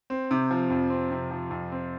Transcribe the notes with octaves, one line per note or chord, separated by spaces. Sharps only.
C4
C3
F3
F2
C4
C3
F3
F2
C4